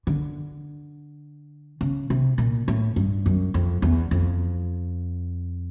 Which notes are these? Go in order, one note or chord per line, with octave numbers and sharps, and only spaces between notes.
D3
C#3
C3
A#2
A2
G2
F#2
F2
E2
F2